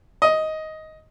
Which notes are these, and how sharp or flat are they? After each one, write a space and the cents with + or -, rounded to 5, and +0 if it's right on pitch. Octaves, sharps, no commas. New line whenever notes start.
D#5 +10